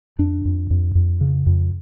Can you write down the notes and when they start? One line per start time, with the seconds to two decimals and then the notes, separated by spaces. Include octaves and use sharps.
0.19 F2 D4
0.45 F2
0.71 F2
0.95 F2
1.21 C#3
1.46 F2